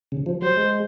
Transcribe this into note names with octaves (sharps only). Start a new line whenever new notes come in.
C#3
F3
F#3 C5
G#3